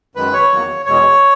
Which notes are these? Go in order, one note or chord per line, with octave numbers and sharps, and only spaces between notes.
F#2 D#3 G#3 B4
C#5
E2 D#3 F#3 A#3
E2 B2 G#3 C#5